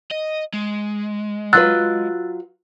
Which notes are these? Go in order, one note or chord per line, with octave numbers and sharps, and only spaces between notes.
D#5
G#3
F#3 F4 B4 E6 F#6 A6